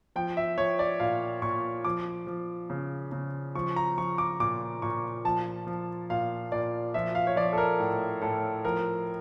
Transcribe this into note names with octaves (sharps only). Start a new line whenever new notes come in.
F3 G5
E5
F3 C#5
D5
A#2 F5
A#2 C#6
F3 D6
F3
C#3
C#3
F3 C#6
A#5
F3 C#6
D6
A#2 D6
A#2 C#6
F3 A5
F3
A#2 F5
A#2 D5
F3 E5
F5
C#5
F3 D5
A4
A#4
A2
A2 A4
F3 A#4